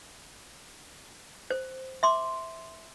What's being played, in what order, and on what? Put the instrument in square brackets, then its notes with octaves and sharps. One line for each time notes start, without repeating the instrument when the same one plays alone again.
[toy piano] C5
E5 C6 D6